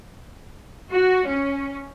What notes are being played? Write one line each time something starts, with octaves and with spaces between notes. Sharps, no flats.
F#4
C#4